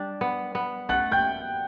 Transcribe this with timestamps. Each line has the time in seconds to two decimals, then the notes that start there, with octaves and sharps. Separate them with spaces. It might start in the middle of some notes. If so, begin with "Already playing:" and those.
Already playing: G3 D4
0.21 B3
0.55 B3
0.89 A3 F#5 F#6
1.12 G5 G6